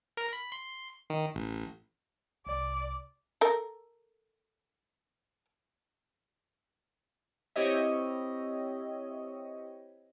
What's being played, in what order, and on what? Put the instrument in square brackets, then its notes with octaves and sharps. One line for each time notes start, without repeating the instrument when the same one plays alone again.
[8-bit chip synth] A#4
B5
C6
D#3
A1
[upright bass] C2 [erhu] D5
[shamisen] A4 A#4
[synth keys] C4 E4 G4 C#5 D#5 E5